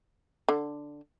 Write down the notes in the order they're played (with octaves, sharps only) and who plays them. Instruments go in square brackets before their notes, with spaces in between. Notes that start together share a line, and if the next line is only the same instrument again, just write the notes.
[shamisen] D3